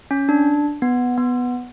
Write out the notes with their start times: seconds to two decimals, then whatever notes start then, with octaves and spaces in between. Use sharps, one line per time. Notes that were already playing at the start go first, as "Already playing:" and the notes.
0.11 C#4
0.29 D4
0.82 B3
1.18 B3